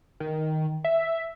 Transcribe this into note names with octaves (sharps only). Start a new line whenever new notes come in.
D#3
E5